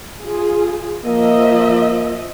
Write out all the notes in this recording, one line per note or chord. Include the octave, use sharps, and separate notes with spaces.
F4 G#4
F3 A#3 D#5 E5